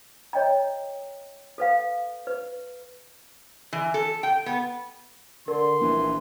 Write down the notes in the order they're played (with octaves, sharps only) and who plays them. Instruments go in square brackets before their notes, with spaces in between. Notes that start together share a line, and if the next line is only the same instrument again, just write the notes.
[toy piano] C#5 D#5 G5 A#5
A4 B4 F5
B4
[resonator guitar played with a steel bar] E3
A4
G5
B3
[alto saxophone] D3 [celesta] A#4 [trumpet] C6
[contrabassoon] A#1 [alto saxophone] E3